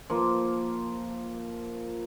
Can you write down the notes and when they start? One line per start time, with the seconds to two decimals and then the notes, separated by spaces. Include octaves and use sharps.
0.10 F3 A#3 F4